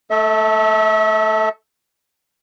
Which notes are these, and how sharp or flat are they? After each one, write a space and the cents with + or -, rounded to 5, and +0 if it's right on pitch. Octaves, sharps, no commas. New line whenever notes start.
A3 +0 A4 +0 E5 -35